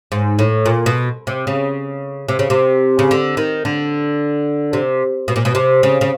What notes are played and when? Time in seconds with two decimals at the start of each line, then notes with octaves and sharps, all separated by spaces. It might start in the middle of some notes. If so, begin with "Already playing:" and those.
0.12 G#2
0.39 A2
0.66 A#2
0.86 B2
1.27 C3
1.47 C#3
2.29 C3
2.39 C#3
2.50 C3
2.99 C#3
3.11 D3
3.37 D#3
3.65 D3
4.73 C3
5.28 B2
5.36 A#2
5.45 B2
5.55 C3
5.83 C#3
6.01 C#3